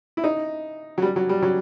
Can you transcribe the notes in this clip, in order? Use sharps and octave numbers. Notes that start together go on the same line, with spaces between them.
E4
D#4
F#3
G3
F#3
G3
F#3